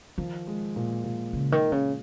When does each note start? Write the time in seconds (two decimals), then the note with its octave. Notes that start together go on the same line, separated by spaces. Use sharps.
0.18 D#3 F3
0.47 G#3
0.76 A#2
1.04 A#2
1.33 C#3
1.52 D#3
1.72 C#3